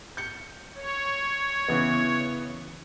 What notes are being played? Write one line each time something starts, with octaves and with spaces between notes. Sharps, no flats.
G6 C#7
C#5
C#3 E3 B3